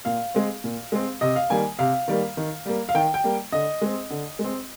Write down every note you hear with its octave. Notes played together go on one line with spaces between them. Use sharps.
A#2 F5
G#3 C4
A#2
G#3 C4
C3 D#5
F5
D#3 G3 A#3 G#5
C3 F5
D#3 G3 A#3
D#3
G3 A#3
F5
D#3 G5
G5
G3 A#3
D3 D#5
G#3 C4
D3
G#3
C4